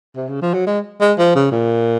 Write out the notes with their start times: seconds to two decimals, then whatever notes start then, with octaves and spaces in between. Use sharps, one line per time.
0.16 C3
0.29 C#3
0.42 F3
0.54 F#3
0.67 G#3
1.01 G#3
1.19 F3
1.35 C#3
1.52 A#2